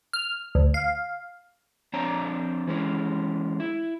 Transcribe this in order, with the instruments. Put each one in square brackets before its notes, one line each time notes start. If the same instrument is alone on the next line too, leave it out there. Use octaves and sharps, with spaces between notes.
[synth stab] F6
D2
F5
[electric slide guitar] F2 C4 D4 C5 C#5 A#5
E3 G#3 C#4
E4